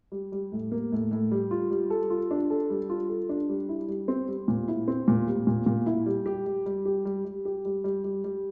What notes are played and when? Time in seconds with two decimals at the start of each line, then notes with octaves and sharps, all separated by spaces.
0.12 G3
0.32 G3
0.52 A2
0.72 A#3
0.92 A2
1.11 A2
1.32 G3
1.51 F4
1.71 G3
1.90 A4
2.10 F4
2.31 D4
2.50 A4
2.70 G3
2.90 F4
3.09 A4
3.29 D4
3.49 G3
3.69 E4
3.88 G3
4.08 C4
4.28 G3
4.48 A#2
4.68 E4
4.88 C4
5.08 A#2
5.28 G3
5.47 A#2
5.66 A#2
5.86 E4
6.06 G3
6.26 G4
6.46 G3
6.66 G3
6.85 G4
7.05 G3
7.25 G3
7.45 G4
7.65 G3
7.84 G3
8.04 G3
8.24 G3